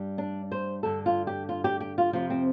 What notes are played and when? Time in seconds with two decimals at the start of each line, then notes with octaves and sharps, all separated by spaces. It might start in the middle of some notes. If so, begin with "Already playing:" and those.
Already playing: G2 G3
0.18 D4
0.52 C5
0.83 G2 D3 G3 A4
1.06 F4
1.27 G4
1.49 F4
1.64 G4
1.81 G4
1.98 F4
2.13 F2 C3 F3 F4
2.30 C4